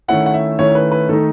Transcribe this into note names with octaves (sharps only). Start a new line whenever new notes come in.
D#3 A3 C#4 E4 F#5
F#5
E5
D#3 A3 C#4 E4 C#5
B4
B4
D#3 A3 D#4 A4